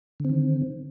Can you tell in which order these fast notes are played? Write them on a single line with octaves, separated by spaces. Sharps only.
D3 C4 D#3